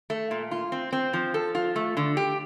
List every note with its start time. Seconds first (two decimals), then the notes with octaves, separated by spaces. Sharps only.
0.10 A3
0.31 A#2
0.51 F4
0.72 C4
0.93 C4
1.13 F3
1.34 A4
1.55 F4
1.76 A3
1.97 D3
2.17 G4